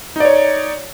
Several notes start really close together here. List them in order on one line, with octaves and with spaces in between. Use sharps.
D#4 D5 C#5